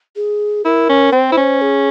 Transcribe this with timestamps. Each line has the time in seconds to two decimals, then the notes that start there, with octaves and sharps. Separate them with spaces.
0.16 G#4
0.65 E4 A#4
0.90 C#4
1.12 C4 C5
1.32 E4
1.37 C#4
1.61 G#4